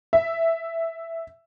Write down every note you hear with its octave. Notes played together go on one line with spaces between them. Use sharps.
E5